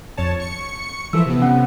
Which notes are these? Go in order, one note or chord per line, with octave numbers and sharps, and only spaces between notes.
F2 C#5 A5
C#6 C#7
E3 F3 A4 E5 E6
C3 B3
C#4 F#5